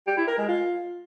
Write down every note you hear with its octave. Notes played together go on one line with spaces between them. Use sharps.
G4
E4
A#4
G#3
F4